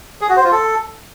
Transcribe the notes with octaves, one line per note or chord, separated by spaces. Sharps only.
G#4
F#4
C5
F4
A4